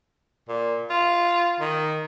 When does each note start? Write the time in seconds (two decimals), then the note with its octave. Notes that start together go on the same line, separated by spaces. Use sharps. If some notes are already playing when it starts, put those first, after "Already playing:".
0.49 A#2
0.90 F4
1.60 D#3